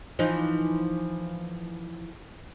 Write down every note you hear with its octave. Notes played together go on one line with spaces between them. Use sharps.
E3 F3 D#4